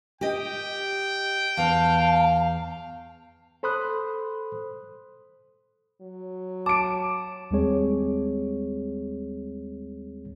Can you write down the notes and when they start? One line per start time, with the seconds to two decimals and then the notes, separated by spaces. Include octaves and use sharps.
0.21 G4 D#5 G5
1.57 E2 F5 A5
3.63 A4 C5 B5 C6 D#6 F#6
6.01 F#3
6.66 A5 D6 D7
7.51 D#2 G3 G#3 C4 G#4 C#5